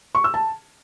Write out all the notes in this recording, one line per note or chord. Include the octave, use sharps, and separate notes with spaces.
C#6
E6
A5